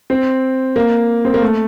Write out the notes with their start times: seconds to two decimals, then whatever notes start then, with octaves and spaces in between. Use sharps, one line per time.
0.10 C4
0.76 A#3
1.25 C4
1.34 A#3
1.42 A3